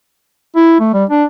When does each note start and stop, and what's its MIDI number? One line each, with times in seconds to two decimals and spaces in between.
0.56 0.75 64
0.80 0.91 57
0.94 1.04 55
1.10 1.24 62